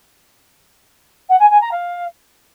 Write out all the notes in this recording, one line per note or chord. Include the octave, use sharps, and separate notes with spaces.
F#5
G#5
G#5
A#5
F5